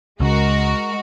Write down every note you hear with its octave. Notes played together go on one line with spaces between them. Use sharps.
C#2 C#3 G#3 F#4 A#4